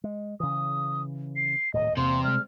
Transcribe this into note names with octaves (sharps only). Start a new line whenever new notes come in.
G#3
C#3 E3 D#6
C7
D#1 D2 A2 D#5
E2 C3 A3 A#3 C6
G3 G#3 F6